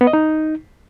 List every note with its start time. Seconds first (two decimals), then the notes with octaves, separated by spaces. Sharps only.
0.01 B3
0.07 D#5
0.13 D#4